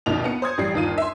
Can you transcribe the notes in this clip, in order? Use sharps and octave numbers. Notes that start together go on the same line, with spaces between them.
A#1 D#2 B2 F7
B3 C#7
C5 D#6 G#6
A1 G3 C7
G1 D#2 F4 D#7
E5 C6